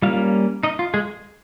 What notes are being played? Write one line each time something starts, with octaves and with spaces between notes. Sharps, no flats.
G3 A#3 C#4 F4 F5
D#4 D#5
F4
G#3 G#4